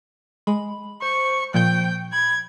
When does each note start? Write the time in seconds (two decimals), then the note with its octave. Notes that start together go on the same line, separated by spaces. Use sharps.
0.47 G#3 B5
1.02 C5 C#6
1.54 A#2 F3 G5 G6
2.13 B5 G#6